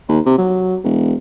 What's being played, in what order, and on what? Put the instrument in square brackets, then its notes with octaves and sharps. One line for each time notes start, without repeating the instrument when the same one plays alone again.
[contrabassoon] D#2
C3
F#3
E1